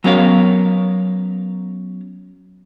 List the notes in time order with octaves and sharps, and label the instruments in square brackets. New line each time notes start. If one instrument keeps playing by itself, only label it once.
[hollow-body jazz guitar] F#3 B3 C#4 A#4 C#5 F5